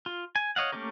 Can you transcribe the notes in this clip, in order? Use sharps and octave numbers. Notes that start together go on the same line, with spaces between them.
F4
G#5
C#5 D#5 F5 F#5
A3 A#3 C#4 G4 A#4